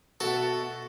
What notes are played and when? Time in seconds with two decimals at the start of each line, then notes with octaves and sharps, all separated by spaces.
0.20 B2 F#4 A4 E5 F#5 A5